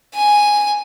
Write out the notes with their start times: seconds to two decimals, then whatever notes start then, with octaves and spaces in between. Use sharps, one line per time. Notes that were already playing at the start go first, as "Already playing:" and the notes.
0.14 G#5